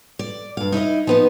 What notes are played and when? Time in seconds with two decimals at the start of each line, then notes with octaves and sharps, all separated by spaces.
0.19 D5
0.57 G2 F5
0.72 D#4 E4 C#5 D#5
1.07 F3 B3 D#4